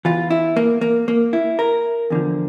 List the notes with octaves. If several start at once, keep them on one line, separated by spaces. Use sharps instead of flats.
E2 E3 F4
E4
A#3
A#3
A#3
E4
A#4
E2 D3 F3